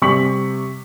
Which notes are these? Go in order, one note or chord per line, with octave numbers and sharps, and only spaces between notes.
C3 G3 C#6 B6 F#7